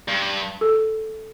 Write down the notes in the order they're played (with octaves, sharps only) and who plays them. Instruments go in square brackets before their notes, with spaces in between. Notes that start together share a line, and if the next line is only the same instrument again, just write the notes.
[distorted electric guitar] G2
[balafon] A4